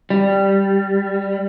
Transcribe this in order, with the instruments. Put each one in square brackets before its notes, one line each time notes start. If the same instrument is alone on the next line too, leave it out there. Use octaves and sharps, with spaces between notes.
[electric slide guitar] G3